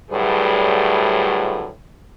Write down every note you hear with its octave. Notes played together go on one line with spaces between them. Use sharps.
D2 A2 F#3 G3 G#4 B4